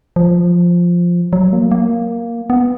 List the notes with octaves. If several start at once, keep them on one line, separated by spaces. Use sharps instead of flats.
F3
F#3
A#3
A#3
B3